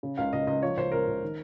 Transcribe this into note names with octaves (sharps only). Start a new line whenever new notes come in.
C#3
C#2 F5
C#2 D#5
C#2 D#5
F3 C#5
C#2 C5
C#2 A#4
C#2
D#3